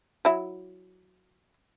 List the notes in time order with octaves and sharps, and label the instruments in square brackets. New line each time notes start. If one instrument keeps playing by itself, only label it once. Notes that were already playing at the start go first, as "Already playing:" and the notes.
[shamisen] F#3 E4